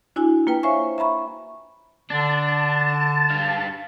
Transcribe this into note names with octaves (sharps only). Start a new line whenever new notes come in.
D4 E4 F#4 G#5
A#3 F4 B4 G5
C5 C#5 E5 F5 G#5 C#6
E5 A#5 B5 C#6
D3 D4 A5
G2 F5